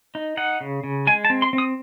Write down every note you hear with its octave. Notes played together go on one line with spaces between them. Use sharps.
D#4
D#4 F#5
C#3
C#3
G#3 G#5
A5
C4
C6
C4
D#6